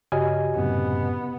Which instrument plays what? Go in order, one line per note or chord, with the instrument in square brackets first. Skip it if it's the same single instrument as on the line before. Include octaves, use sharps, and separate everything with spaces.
[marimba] G2 C#3 F#4 [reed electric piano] G4 D#5 G#5
[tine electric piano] F#2 A2 C3 [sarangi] B3